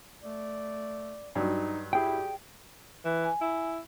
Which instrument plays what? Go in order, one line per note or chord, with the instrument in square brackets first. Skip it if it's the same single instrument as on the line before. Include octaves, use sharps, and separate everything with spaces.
[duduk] A3 [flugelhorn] D5
[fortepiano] G2 F#3 [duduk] D#4
[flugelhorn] E4 [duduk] G4 [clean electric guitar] G#4 G5
[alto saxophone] E3
[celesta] G#5
[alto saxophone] E4